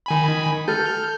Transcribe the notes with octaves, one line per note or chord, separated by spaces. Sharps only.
D#3 G#5 B5
A4 F6 G6